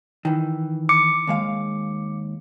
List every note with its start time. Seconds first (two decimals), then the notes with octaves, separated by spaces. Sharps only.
0.25 D#3 E3
0.89 D6 C#7
1.27 D#2 G#3 F5